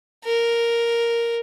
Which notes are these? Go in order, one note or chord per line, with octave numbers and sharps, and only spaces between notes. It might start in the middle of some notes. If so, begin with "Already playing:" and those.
A#4